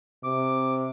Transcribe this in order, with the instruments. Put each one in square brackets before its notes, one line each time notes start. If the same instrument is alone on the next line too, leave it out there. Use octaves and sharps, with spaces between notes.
[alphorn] C3 [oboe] D6